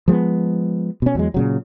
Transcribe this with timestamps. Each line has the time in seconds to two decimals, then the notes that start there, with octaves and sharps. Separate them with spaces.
0.08 F3 G#3 A#3 B3
1.02 B2 C#4
1.15 E2 F#3 G#3
1.34 A#2 C#3 F#3